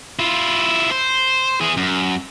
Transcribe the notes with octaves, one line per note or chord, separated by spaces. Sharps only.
E4 F4
C5
E3 G#4
F#2